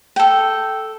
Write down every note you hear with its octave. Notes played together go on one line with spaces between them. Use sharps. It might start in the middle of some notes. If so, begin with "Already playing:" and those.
A4 G5